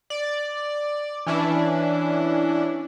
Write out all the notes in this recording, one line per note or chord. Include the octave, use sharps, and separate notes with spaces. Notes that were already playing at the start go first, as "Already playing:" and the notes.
D5
E3 C#4 D4 E4